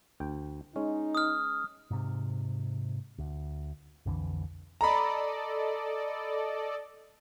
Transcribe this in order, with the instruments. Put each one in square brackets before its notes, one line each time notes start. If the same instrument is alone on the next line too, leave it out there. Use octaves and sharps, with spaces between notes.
[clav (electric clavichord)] D2 G5
[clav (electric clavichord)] G#3 C#4 [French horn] D#4
[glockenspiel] D#6 F6
[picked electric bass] G#2 C3
D2
B1 F2 D3 E3
[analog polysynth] A4 D5 D#5 [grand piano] A#5 B5